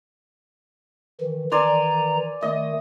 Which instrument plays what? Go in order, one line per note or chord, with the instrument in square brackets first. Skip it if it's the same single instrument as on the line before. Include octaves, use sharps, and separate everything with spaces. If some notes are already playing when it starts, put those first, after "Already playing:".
[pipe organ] D#3 E3
[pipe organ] D#3 E3 A#5 [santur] D5 G#5 C6
[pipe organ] D#3 A3 [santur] D#5